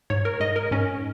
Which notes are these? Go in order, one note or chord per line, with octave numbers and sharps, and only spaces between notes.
G#2 C#5
A#4
G#2 D#5
A#4
G#2 C#4